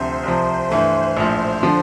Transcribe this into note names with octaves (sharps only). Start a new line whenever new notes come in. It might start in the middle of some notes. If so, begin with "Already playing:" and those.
Already playing: D2 C3 F3 C4 C5
C2 C3 F3
G2 E3 A3 C5
A#1 A2 F3
D3 F3